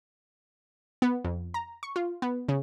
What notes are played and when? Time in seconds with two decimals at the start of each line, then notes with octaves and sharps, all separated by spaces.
1.02 B3
1.25 F2
1.54 A#5
1.83 C#6
1.96 F4
2.22 B3
2.49 C#3